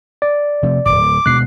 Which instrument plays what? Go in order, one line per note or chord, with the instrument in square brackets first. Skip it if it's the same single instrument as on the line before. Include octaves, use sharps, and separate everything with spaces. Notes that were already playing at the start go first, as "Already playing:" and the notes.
[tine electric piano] D5
[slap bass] C3 F3 A3
[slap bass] D1 C#2 [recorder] D6
[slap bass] D2 B2 G#3 [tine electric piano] F#6 C7